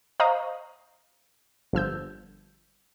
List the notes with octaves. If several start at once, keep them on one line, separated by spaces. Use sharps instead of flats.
C5 D#5 F5 A#5 C#6 D#6
G1 F3 E6 G6